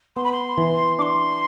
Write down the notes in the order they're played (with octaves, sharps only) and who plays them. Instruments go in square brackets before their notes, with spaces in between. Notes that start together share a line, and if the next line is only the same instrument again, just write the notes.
[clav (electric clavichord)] B3 [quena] C6
[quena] B5
C6
[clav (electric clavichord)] E3
[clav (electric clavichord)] D4 [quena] C6 D6